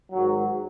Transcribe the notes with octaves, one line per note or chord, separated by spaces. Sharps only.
G#2 D#3 F#3